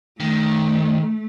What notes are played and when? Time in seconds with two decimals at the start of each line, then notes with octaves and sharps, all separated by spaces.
0.20 D#3 A3